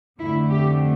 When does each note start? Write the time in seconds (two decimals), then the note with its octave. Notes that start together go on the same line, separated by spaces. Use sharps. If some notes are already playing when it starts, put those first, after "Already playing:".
0.18 F2 D3 A3 E4
0.49 G4